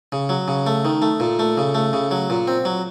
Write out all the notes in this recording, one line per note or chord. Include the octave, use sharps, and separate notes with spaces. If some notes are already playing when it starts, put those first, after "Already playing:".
C#3
F#3
C#3
A3
D#3
A3
A#2
A3
C#3
A3
C#3
F#3
A#2
C4
F#3